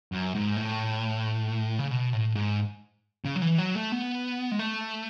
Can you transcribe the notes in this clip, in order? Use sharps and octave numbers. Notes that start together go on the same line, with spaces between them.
F#2
G#2
A2
C#3
B2
A2
G#2
C#3
F#3
E3
F#3
A3
B3
G#3
A3